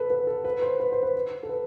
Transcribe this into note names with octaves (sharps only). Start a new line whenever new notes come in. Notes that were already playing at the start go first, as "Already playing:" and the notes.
Already playing: A4 B4
B4
A4
B4
C5
B4
C5
B4
A4
B4